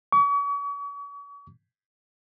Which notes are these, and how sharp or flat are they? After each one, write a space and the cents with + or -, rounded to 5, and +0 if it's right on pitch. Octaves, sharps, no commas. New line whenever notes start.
C#6 +40